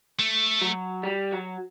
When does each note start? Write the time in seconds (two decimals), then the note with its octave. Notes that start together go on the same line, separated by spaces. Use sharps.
0.19 A3
0.62 F#3
1.03 G3
1.32 F#3